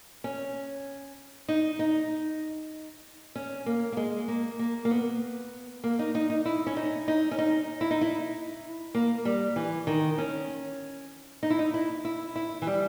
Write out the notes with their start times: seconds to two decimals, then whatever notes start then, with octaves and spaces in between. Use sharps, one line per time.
0.24 C#4
1.48 D#4
1.79 D#4
3.36 C#4
3.66 A#3
3.92 A#3
3.97 G#3
4.28 A#3
4.59 A#3
4.85 A#3
4.91 B3
5.84 A#3
5.99 D#4
6.15 D#4
6.30 D#4
6.45 E4
6.67 C#4
6.77 D#4
7.08 D#4
7.31 C#4
7.39 D#4
7.81 E4
7.91 D#4
8.01 E4
8.95 A#3
9.25 G3
9.56 E3
9.87 D#3
10.18 C#4
11.43 D#4
11.50 E4
11.59 D#4
11.74 E4
12.05 E4
12.36 E4
12.62 E3
12.67 G3